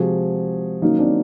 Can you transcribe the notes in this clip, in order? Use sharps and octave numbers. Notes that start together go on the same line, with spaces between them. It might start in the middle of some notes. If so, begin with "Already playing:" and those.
Already playing: C3 F3 G#3 F#4 G#4
D#3 F#3 A#3 C#4 D#4
C4 D4